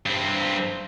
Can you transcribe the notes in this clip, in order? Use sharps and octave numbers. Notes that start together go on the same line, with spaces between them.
G2 C4